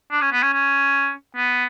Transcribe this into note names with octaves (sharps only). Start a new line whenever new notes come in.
D4
C#4
B3
C#4
C#4
B3